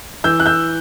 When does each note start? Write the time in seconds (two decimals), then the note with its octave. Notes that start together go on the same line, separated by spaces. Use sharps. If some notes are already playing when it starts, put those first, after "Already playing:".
0.24 E3 E6 G6
0.40 F#6
0.46 E6 G6